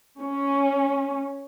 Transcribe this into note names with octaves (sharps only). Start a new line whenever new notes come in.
C#4